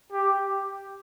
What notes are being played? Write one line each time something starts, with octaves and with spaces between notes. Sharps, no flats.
G4